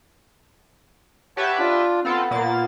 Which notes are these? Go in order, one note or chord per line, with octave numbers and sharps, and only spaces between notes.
G4 B4 C#5 E5 F#5 A5
D4 F4
B3 C4 F4 A4
A#2 A#3 A6